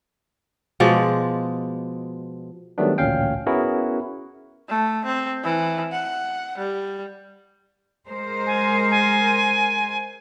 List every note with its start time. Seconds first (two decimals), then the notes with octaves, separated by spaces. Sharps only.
0.80 B2 F3 G#3 D5
2.78 D#3 F#3 G3 A3 B3 D4
2.98 A1 D2 A#2 C#4 F5 G5
3.46 B3 C#4 E4 F#4 G#4 A#4
4.69 A3
5.05 C4
5.44 E3
5.92 F#5
6.58 G3
8.08 G#3 A#4 C5
8.46 G#5
8.91 G#5